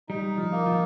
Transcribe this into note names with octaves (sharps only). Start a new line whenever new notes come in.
G3 D#4
F3
A#3
F3